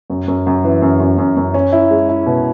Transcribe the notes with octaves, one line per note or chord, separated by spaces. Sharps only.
F#2
F#2
F#2
E3
F#2
F#2
F#2
F#2
C#4
E4
G#3
E4
B2